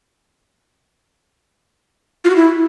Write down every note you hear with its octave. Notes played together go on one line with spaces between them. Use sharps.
F4
F#4
E4